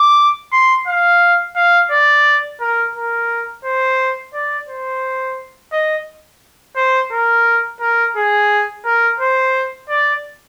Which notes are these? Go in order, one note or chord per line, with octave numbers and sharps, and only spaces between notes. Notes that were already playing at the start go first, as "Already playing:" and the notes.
Already playing: D6
C6
F5
F5
D5
A#4
A#4
C5
D5
C5
D#5
C5
A#4
A#4
G#4
A#4
C5
D5